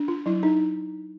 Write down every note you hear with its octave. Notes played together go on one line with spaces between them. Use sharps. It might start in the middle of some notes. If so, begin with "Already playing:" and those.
Already playing: D4
F4
F#3 E4
D#4